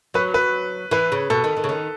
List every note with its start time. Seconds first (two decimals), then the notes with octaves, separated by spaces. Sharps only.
0.14 F#3 B4
0.34 B4
0.91 E3 B4
1.12 C#3
1.30 B2 A4
1.44 D#3
1.57 D#3
1.64 C#3
1.69 D#3